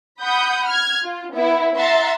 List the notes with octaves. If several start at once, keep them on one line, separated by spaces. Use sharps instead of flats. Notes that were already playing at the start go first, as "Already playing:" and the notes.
F#5 B5 D#6 G6
F6 G#6
F4
B3 E4
E5 F#5 A#5 C6 A6